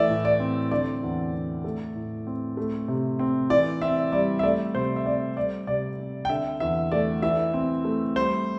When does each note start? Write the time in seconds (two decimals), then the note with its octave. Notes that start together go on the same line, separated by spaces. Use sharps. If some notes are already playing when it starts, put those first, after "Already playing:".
Already playing: E3 A3 D5 E5
0.09 A2
0.25 D5
0.40 C4
0.71 D3 D5
1.03 E2
1.33 C4
1.64 A3
1.95 A2
2.27 C4
2.57 A3
2.88 C3
3.19 C4
3.50 E3 D5
3.82 C4 E5
4.12 G3 D5
4.39 E5
4.43 A3 D5
4.75 C3 C5
4.96 E5
5.05 C4 D5
5.36 G3 D5
5.67 C3 D5
5.99 C4
6.25 G5
6.29 D3 E5
6.60 E2 E5
6.92 A3 D5
7.22 E3 E5
7.54 C4
7.85 A3
8.16 G3 C5